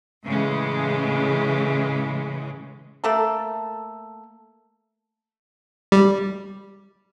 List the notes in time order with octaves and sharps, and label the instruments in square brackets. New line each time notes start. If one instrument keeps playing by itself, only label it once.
[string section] A2 C#3 E3 G#3
[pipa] A3 A#3 A4
[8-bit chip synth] G3